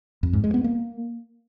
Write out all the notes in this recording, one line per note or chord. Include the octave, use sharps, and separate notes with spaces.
F2
G#2
G#3
B3
A#3